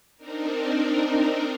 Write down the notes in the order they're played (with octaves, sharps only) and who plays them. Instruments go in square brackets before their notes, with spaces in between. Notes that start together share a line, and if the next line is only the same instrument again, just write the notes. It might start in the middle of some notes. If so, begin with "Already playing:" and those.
[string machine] C4 D4 D#4 A#4